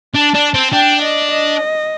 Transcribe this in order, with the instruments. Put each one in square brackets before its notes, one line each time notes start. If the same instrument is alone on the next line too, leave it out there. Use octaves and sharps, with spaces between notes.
[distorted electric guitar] D4 [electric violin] A5
[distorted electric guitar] D4
C4
[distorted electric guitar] D4 [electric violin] G5
[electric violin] D#5
D#5